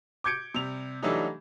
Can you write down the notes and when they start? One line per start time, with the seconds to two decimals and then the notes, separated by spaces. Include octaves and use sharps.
0.24 D6 G6 G#6 C#7 D7
0.54 C3 G3 F7
1.02 E3 F#3 G3 A3 D4 D#4